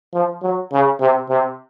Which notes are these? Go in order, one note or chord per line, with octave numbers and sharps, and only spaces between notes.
F3
F#3
C#3
C3
C3